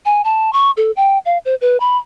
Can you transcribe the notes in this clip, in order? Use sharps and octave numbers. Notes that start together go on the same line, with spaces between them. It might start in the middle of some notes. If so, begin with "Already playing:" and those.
G#5
A5
C#6
A4
G5
F5
C5
B4
B5